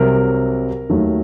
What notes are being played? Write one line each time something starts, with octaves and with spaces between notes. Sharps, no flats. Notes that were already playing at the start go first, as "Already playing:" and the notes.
Already playing: C2 C3 F#3 A#4
D#2 D#3 F#3 A3